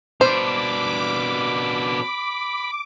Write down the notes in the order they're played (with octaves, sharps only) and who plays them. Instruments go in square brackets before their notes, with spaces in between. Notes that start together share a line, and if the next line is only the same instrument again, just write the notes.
[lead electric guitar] B2 D4 [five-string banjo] C5 [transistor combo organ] B5 [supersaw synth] D6